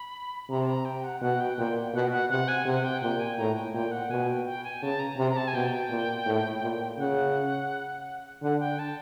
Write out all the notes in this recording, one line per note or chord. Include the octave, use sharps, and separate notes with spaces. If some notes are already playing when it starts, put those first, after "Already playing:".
Already playing: B5
C3 A#5
A5
A#5
G5
F#5
B2 F#5
G5
A#2 G5
B2 F#5
F#5
C3 F#5
G#5
C3 F#5
G5
A#2 G5
G#5
A2 A#5
G5
A#2 G5
F#5
B2 G#5
G5
G5
G#5
C#3 A5
A#5
C3 A#5
A#5
A5
G#5
B2 G5
A#2
A2
A#2
C#3 F#5
D3 F#5
G5
A5